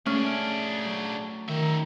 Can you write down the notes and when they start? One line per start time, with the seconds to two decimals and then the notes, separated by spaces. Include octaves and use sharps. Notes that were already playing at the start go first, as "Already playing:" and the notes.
0.06 A3 C#4 D4 G#4 G#5 F#6
0.85 F#3
1.49 D#3 D#4 E5